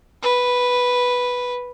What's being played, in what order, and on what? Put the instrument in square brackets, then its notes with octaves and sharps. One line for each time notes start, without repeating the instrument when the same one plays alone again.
[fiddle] B4